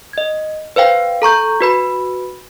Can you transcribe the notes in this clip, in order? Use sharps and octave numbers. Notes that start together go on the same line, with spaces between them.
D#5 G#6
B4 C5 F5 G5
A4 A#5 C#6 G6
F#4 B4 B5